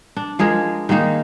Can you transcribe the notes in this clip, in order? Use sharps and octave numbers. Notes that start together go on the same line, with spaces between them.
D4
F3 G#3 G#4 A#4
D#3 G#3 A#3 D#4